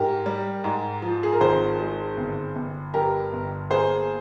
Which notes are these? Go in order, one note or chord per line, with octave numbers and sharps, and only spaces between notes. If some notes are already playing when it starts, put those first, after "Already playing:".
Already playing: G#2 G4 A#4
G3
G#2
F3
G#4
A#4
G#1 G#4 C5
G#3
G1
G1
G2 G4 A#4
G1
A#3 G#4 C5